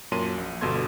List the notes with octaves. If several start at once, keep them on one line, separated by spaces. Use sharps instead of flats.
F#2 A#2 C#5 A5 C6 D#7
A#1
G1 G2 B2 A4 C6 G#6